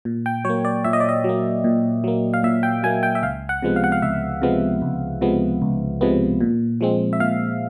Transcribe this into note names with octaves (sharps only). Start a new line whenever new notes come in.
A#2
G5
F#3 A#3 C#5
D5
A#2 E5
D#5
D5
D#5
F#3 A#3
A#2
F#3 A#3
F5
A#2 E5
G5
F#3 A#3 G#5
G5
E5
C#2 F5
F#5
C3 F3 G#3 B3
F5
F#5
F5
C#2 E5
C3 F3 G#3 B3
C#2
C3 F3 G#3 B3
C#2
C3 F3 G#3 B3
A#2
F3 G#3 C4
E5
A#2 F5